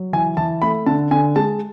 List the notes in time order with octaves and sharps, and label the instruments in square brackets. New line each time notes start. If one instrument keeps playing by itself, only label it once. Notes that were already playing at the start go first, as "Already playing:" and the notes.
Already playing: [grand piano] F#3
E3 G#5
E3 A5
A3 B5
D3 A5
D3 G#5
G#3 A5